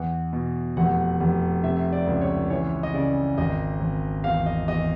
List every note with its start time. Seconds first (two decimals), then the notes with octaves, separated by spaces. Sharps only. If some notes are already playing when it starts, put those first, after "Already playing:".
Already playing: E2 F#5
0.33 B2
0.77 F1 F#5
1.20 F1
1.64 C3 E5
1.93 D5
2.07 C#2
2.21 C#5
2.50 E3 C#5
2.83 D#5
2.94 C#3 D5
3.38 G#1 D#5
3.80 G#1
4.24 E2 F5
4.46 D#5
4.68 E2 D#5